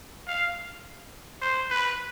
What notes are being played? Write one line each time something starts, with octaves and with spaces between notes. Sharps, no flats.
F5
C5
B4